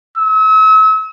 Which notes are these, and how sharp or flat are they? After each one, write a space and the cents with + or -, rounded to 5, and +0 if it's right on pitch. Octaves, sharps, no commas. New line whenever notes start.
E6 -40